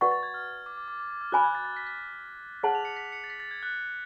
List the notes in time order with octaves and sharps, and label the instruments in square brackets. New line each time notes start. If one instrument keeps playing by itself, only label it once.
[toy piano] F#4 B4 D5 F#5 C#6 [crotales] A6
[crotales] A6
G#6
F6
D6
D6
D6
D6
D6
F6
[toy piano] F#4 C#5 G#5 B5 [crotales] F#6
[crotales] G#6
A6
A6
B6
B6
[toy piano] G#4 C#5 F#5 A5 [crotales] F#7
[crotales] F7
C#7
B6
C#7
A6
B6
A6
G#6
F#6